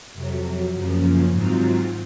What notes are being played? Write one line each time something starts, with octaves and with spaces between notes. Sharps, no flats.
F2 C3 F#3
F#2 C#3 F3 A#3
G#2 D#3 F#3 C4 F4